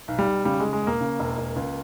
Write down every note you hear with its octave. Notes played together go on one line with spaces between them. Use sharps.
B1
G3
B1
C#3 G3
C#3 G#3
G#3
E1 A#3
C#3
E1
E1
C#2